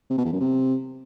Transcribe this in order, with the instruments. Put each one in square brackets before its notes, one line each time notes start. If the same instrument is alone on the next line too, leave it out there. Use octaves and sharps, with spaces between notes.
[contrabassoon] C3
B2
E2
F#2
C3